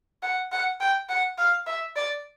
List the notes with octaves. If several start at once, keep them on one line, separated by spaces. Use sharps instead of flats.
F#5
F#5
G5
F#5
F5
E5
D5